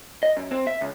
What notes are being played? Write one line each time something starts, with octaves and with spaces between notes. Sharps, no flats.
D#5
F#2
C4
E5
C#2